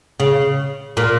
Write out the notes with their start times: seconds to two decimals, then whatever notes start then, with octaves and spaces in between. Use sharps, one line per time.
0.20 C#3
0.97 A#2